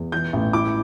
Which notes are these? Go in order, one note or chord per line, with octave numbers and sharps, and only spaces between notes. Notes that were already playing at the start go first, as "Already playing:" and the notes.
Already playing: E2
E3 G6
A1
E4 D6